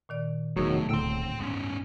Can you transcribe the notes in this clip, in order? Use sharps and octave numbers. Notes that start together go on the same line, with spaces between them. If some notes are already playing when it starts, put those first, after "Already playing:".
A#2 D#3 D5
E1 A2 C3 D#3 F#3 B3 G#4
D1 D2 A2 D3 A#3 G5 C6 E6
G2 G#3 B3 C#4